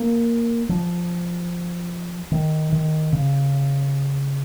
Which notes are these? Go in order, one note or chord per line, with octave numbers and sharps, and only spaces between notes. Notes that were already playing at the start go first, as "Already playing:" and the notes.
Already playing: A#3
F3
D#3
D#3
C#3